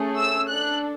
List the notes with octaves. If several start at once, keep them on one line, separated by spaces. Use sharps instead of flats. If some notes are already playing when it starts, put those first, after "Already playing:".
Already playing: A3 C#4 G#4
E6
D4 A4 F#6